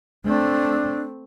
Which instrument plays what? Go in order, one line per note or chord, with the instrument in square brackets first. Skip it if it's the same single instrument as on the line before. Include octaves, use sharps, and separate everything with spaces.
[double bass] A3 C4 [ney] D4